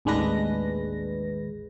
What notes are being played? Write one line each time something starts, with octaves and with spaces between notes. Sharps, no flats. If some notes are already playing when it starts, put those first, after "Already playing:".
A1 D#2 G#3 D4 B4 A#6